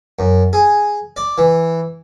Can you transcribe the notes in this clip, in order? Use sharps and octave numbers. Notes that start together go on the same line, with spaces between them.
F#2
G#4
D5
E3